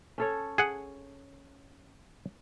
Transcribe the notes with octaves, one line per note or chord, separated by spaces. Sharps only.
C#4 A4 C#5
G#4 F#5